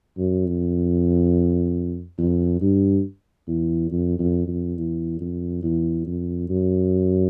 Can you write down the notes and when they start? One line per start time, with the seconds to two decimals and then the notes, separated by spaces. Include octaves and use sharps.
0.18 F#2
0.46 F2
2.18 F2
2.61 G2
3.48 E2
3.91 F2
4.19 F2
4.48 F2
4.77 E2
5.21 F2
5.63 E2
6.06 F2
6.49 F#2